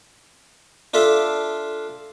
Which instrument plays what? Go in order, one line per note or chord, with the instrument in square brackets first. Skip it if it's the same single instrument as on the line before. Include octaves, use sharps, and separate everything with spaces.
[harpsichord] D4 F4 A4 E5